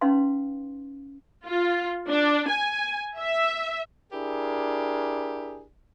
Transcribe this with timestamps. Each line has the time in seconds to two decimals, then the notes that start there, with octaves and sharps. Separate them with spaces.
0.01 C#4 D#4 B4 F5 C6
1.46 F4
2.09 D4
2.49 G#5
3.18 E5
4.12 D4 E4 G4 G#4 A#4